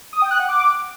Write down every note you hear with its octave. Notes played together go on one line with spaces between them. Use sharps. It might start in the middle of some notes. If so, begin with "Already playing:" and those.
D#6
G5
F#6
F#5
D6